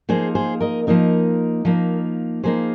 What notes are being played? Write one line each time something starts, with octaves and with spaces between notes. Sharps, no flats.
F3 A#3 D#4 G#4 C5
G#4 C5
A#4 D#5
F3 A#3 D#4 A#4 D#5
F3 A#3 D#4
F3 A#3 D#4 G#4 C5